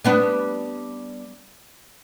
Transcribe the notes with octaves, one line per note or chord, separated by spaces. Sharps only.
G3 B3 D4